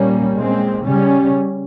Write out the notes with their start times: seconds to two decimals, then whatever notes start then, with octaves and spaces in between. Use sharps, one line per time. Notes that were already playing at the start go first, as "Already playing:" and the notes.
Already playing: A#2 G3 A#3 C#4
0.36 A#2 G#3 C4
0.87 C#3 G3 C#4